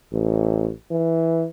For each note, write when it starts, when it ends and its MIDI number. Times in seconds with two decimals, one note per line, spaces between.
0.12 0.69 33
0.91 1.46 52